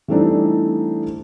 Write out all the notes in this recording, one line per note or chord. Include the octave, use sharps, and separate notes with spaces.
E3 G3 A3 C4 D4 D#4